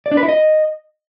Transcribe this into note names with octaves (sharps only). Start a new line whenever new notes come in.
D5
D4
B4
E4
D#5